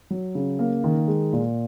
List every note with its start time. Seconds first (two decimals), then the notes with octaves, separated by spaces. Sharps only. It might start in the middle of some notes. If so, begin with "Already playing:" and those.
0.10 F#3
0.35 C#3
0.59 A#3
0.84 D#3
1.07 G#3
1.33 A#2